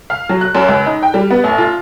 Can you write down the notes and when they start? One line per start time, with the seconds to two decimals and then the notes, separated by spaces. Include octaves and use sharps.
0.10 F5
0.29 F#3
0.41 F#6
0.55 F#2
0.68 C#2
0.86 D#4
1.02 G5
1.14 G3
1.30 B3
1.44 A1
1.58 F4